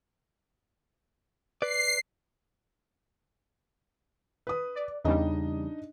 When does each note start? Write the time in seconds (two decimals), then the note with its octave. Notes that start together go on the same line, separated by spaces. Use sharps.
1.62 B4 D5 C7
4.47 B4 D#6
4.75 D5
5.04 E2 C#3 G3 D4 D#4 D#5